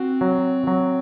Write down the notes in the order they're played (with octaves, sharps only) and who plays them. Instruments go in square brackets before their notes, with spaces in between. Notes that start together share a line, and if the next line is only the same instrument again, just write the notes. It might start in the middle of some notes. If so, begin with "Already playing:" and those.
Already playing: [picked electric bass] C4 [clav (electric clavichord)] F#4
[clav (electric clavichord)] F#3
F#3